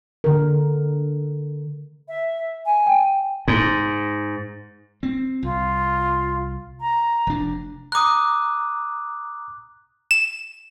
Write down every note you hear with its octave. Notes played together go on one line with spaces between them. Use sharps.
D3 A#4
E5
G#5
G5
G#2
C4
C2 F4
A#5
F1 D4
A#5 D6 D#6 F#6
E7